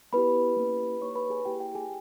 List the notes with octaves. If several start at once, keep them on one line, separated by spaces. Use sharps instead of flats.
B3 E4 G4 B4 B5
A#3 C#4 E4 G4
A#3 D#4 G4 C#5 C#6
B4 B5
G#4 G#5
A#3 E4 G4 G5
G4 G5
G#4 G#5